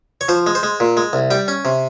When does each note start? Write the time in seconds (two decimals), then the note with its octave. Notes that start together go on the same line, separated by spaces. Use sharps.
0.21 C#5
0.29 F3 C5
0.47 G#3
0.55 C5
0.63 G#3
0.80 A#2
0.97 G#3
1.13 C2
1.31 G3 G5
1.48 C#4
1.65 C3